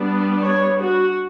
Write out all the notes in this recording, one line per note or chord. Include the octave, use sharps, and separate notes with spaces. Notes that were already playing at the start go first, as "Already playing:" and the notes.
Already playing: G3 B3 D4
C#5
F#4